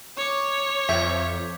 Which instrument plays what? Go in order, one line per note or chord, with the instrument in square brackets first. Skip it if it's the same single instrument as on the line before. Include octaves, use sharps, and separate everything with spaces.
[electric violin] C#5 [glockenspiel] C#6 D6
[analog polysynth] F2 [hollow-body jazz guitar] E5 [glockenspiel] G6 G#6 B6